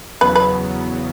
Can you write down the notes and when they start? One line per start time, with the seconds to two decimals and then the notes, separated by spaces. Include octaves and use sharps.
0.21 E2 C#3 F#3 B3 B4
0.35 B4